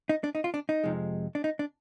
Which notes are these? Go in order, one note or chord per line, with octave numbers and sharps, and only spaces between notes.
D#4
D4
D#4
F4
D4
D#4
F2 C3 F3 G#3
D4
D#4
D4